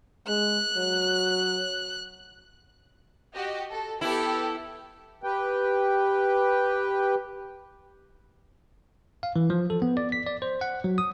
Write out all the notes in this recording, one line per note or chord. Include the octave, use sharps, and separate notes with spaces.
G#3 F#6
F#3
F#4 G4 D#5
A4
B3 E4 G4 A4
G4 B4 G5
F5
E3
F3
A4
B3
D5
B6
D5
C5
F#5
F#3
D#6